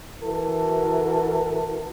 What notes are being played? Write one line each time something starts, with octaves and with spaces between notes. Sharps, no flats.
E3 F#4 A4 A#4